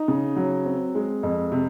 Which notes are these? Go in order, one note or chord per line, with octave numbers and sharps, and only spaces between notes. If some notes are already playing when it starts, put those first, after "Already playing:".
Already playing: D#4
C#3
F#3
C4
G#3
F2
C3